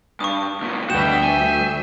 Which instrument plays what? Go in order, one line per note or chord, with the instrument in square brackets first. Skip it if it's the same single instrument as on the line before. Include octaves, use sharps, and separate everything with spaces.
[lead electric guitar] G2 [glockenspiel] C#6 D#6
[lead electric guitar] C#2 A#2
[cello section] D2 G3 E5 [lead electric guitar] F#4 B4 [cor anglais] G5 [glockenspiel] E7
[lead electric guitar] G#5